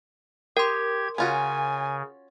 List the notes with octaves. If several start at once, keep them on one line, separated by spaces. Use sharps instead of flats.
G4 A#4 G5 C6 G#6
C#3 C#4 F4 F#4 G#5